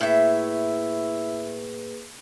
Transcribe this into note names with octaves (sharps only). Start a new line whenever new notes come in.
A2 A#3 E4 G#4 B4 E5